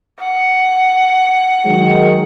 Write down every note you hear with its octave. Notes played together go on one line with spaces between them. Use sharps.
F#5
D#3 F#3 G#3